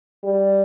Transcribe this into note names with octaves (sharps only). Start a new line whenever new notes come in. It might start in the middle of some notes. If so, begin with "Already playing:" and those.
G3